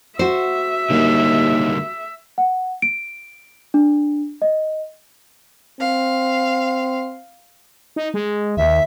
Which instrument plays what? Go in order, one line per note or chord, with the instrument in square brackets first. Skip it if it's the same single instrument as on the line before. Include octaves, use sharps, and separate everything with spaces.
[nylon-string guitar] F#4 C5 [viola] E5
[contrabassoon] D#2 [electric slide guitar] D3 G3 A#3
[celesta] F#5
D7
D4
D#5
[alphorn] C4 [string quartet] F5
[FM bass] D#4
G#3
[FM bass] D#2 [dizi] E5